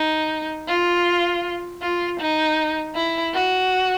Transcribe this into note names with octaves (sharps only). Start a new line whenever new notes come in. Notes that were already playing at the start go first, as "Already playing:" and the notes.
Already playing: D#4
F4
F4
D#4
E4
F#4